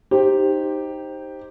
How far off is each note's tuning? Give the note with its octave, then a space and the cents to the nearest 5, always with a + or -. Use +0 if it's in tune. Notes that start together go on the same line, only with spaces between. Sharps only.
D#4 +0 G4 +0 C5 +10